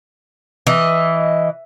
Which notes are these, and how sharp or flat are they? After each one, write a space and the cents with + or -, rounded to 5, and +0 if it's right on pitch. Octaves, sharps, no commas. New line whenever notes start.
E3 +0 D#5 +0